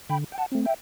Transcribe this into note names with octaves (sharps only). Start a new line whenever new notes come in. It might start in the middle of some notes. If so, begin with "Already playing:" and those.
D3 G5 B5
G5
F#5 A5
A3 C4
E5 G5